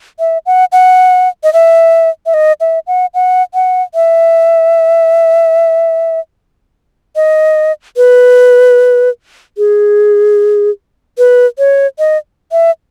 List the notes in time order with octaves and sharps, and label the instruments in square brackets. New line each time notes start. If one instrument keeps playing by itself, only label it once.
[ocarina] E5
F#5
F#5
D#5
E5
E5
D#5
E5
F#5
F#5
F#5
E5
D#5
B4
G#4
B4
C#5
D#5
E5